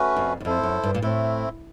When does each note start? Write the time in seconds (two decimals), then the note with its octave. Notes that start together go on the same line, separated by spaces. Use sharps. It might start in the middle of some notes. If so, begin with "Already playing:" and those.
Already playing: A3 C#4 F#4 B4
0.16 F2
0.40 F#2
0.45 F2 E4 A4 C5
0.63 F#2
0.83 G2
0.94 A#2
1.02 A2 A3 C4 E4